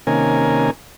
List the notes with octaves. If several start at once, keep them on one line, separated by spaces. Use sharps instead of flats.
C3 D#3 A#3 C#4 A#4 G#5